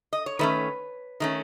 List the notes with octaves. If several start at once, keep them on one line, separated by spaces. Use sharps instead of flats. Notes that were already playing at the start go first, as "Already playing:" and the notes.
D#5
C#5
D#3 A3 C#4 B4
D#3 A3 C#4